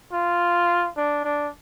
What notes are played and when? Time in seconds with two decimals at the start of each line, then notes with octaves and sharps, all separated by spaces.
0.13 F4
0.97 D4
1.25 D4